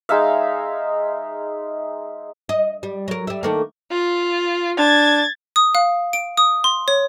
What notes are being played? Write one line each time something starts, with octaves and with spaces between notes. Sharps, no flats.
G#3 D#4 E5 F5
D#5
G3
F#3 A#4
G3 E5
D#3 A3 A#3
F4
D4 G#6 A6
D#6
F5
D7
D#6
C6
C#5